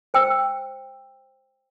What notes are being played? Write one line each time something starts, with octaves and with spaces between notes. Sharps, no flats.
C5 G5 E6